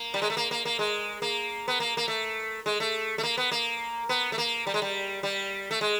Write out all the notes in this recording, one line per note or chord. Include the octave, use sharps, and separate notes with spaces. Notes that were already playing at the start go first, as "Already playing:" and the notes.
Already playing: A#3
G3
G#3
A3
A#3
A#3
A#3
G#3
A#3
B3
A#3
A#3
A3
G#3
A3
A3
A#3
B3
A#3
B3
A3
A#3
G3
G#3
G3
G3
A3
G#3